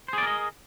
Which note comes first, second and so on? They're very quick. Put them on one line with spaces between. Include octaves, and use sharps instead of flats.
C5 G#4 D5 A#4 D#5